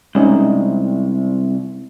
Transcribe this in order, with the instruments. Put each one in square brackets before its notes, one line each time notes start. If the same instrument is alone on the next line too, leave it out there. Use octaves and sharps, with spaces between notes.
[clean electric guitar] C2 [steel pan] G#3 C#4 D#4